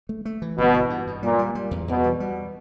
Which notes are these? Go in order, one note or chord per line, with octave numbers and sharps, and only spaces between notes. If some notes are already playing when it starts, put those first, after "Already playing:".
A3
A3
E3
G1 B2
E3
G2
G2
A#2 G3
G3
G3
E2
E2 B2
G3
G3